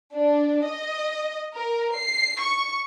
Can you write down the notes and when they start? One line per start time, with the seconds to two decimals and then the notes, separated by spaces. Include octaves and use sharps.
0.12 D4
0.64 D#5
1.52 A#4
1.93 C7
2.37 C#6